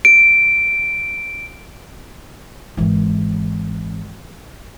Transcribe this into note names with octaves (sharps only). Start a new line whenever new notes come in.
D7
G#1 E3